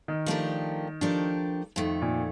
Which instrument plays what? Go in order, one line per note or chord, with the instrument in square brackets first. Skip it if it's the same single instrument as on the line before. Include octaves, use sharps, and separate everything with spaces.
[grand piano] D#3
[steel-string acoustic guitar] F3 A3 D4 G4 A#4
F3 A3 D4 G4 A#4
F2 D#3 A3
[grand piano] A#2